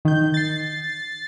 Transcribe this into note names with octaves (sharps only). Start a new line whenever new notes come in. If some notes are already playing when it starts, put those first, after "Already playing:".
D#3 G6
A6 C7